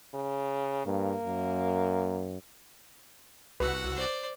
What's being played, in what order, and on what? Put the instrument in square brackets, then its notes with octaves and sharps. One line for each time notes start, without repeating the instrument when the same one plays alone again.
[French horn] C#3
[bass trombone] G2 [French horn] A#3
[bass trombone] F#2
[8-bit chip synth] C2 F#4 E6 [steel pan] B4 [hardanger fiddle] F#5
[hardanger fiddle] C5 D5